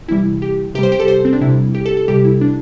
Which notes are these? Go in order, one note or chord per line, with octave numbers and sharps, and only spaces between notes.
C3 E3 G3 E4
G4
C3 G3 G4 C5
G4
A4
C5
C4
D4
C3 G3 E4
G4
A4
A4
C3 G3 G4
E4
D4